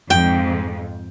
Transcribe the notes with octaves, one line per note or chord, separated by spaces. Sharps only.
F2 G#2 G5